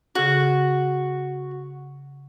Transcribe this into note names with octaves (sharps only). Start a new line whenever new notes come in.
C#3 F#4 G#4